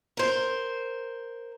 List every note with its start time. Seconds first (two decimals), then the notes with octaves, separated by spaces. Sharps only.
0.17 A#4 C5